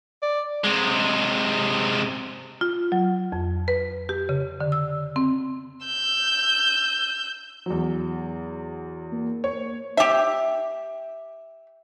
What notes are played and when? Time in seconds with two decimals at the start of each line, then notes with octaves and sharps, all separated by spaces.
0.22 D5
0.64 C3 G#3
2.61 F4
2.92 F#3
3.32 F2
3.68 B4
4.09 G4
4.29 C#3
4.60 D3
4.72 E6
5.16 C4
5.86 E6 G6
7.66 E2 F#3
9.12 A#3
9.44 C#5
9.97 G4 E5